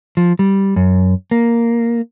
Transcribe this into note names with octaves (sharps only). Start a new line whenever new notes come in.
F3
G3
F#2
A#3